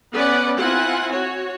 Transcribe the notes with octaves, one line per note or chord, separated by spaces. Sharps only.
B3 C#4 B4 D5 F#5
C4 E4 F4 F#5 G#5
F#4 C#5